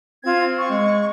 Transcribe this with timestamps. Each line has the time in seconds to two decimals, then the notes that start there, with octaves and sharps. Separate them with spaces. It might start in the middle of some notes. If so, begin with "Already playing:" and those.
0.24 C4 F4 G#6
0.57 C#6
0.70 G#3